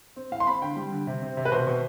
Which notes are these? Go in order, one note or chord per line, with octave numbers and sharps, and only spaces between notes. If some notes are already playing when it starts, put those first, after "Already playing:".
C4
A2 F5
C6
C4 B5
D3 G5
G3
D3
C3
C4
C3
B4
B2 C5
B2